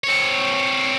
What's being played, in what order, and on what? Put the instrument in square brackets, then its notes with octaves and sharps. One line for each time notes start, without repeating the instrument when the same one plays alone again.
[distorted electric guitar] C4 C#5